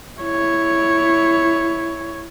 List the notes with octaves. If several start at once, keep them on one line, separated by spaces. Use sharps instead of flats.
E4 C#5